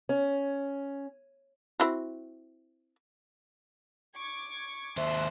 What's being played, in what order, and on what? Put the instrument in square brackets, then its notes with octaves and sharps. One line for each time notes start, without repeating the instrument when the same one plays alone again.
[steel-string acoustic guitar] C#4
[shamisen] C4 E4 F#4
[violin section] C#6 D6 G#6
[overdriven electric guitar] D#2 C5 [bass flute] E5 [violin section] C6 E6 F#6